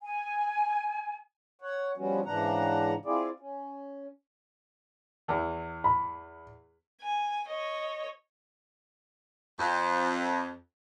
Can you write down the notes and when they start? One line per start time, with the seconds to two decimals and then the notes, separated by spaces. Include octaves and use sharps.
0.02 G#5
1.62 C#5 F#5
1.97 F3 G3 B3 C#4 F#4
2.25 G#2 C#3 E3 D4 F#5 A#5
3.05 C4 E4 F4 G#4 D5
3.40 C#4
5.28 E2 E3
5.84 B5
7.02 G#5
7.48 C#5 D#5
9.60 F2